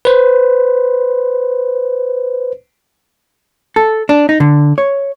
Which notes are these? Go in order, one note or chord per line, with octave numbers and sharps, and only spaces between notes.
B4 C5
A4
D4
D#4
D3
C#5